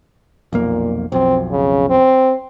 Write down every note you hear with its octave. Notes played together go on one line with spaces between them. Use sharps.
B1 F2 A#2 A#3
B1 F2 C4
C#3
C4